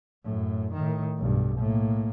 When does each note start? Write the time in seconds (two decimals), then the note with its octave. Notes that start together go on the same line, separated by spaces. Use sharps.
0.25 F#2 A2
0.74 A2 D#3
1.18 B1 G2
1.59 A2 A#3